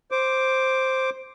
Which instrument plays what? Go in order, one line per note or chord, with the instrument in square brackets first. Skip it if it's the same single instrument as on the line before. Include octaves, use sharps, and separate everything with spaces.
[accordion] C5 D6